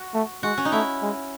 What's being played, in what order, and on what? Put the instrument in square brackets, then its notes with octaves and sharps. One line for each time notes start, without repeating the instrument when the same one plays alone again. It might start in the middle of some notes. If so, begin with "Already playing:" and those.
Already playing: [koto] F#4
[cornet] A3
[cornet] G#3 [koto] F#4
[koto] C#4
D#4
[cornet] A3 [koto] E4
[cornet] G#3